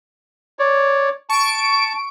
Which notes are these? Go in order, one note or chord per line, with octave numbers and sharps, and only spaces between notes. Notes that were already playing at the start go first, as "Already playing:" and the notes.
C#5 D5
A5 C#6 D7